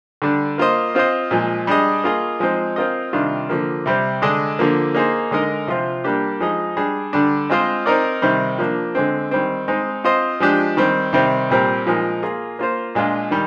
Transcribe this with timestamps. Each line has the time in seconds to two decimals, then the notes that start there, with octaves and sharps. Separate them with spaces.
0.22 D3 G3 D4
0.58 A#3 F4 C5 D#5
0.95 C4 F4 C5 D#5
1.31 A#2 F3 G#3
1.67 G3 D4 G#4 D#5
2.04 A#3 F4 G#4 D#5
2.40 F3 G#3 C4 D#4
2.76 C4 F4 A#4 D#5
3.13 C3 D#3 G3 D4 F4
3.49 D3 F3 A#3
3.86 C3 G3 C4
4.22 D3 G#3 D4 G#4 D#5
4.59 D3 F3 A#3
4.94 A#3 D#4 G#4 C5
5.31 D3 G#3 D#4 A#4 D#5
5.67 C3 F3 C4 F4
6.04 G3 A#3 D4 G4
6.40 F3 G#3 D#4 G#4 D#5
6.77 G3 D4 G#4
7.13 D3 G3 D4
7.50 G#3 C4 F4 C5 D#5
7.86 C4 D#4 A#4 D5
8.22 C3 D#3 G3 C4
8.59 F3 A#3 D4
8.95 D3 G#3 C4
9.31 D#3 G3 C4
9.68 G#3 C4 D#4
10.04 C4 F4 C5 D#5
10.40 F3 G#3 D4 G4
10.77 D#3 G3 C4
11.13 C3 D#3 G3 C4
11.50 A#2 G3 C4 G4 A#4
11.86 A#2 F3 G#3 D#4 A#4
12.22 A#3 F4 G#4
12.59 A#3 F4 C5
12.95 A#2 G#3 D4 F4
13.31 D#3 G3